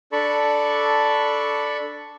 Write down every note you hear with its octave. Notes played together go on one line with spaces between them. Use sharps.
D4 A4 D5 A5 B5 C#6